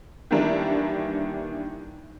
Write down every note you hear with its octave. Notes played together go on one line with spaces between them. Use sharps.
D#3 E3 G3 A#3 D4 E4